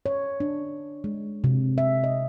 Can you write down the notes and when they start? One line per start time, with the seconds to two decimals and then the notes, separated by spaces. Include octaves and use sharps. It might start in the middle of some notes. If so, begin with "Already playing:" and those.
0.06 C#5
0.40 D4
1.04 G#3
1.44 C3
1.78 E5
2.04 D#5